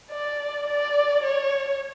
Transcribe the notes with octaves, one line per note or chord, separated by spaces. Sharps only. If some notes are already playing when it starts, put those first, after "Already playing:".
D5
D5
C#5